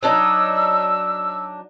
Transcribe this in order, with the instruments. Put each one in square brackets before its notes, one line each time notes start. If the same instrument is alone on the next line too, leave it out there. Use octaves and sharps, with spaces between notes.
[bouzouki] F#3 D4 D#4 [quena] E6